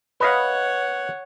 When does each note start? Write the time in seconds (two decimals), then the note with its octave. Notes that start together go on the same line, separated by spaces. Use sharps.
0.20 B4 C#5 D#5 F5 F#5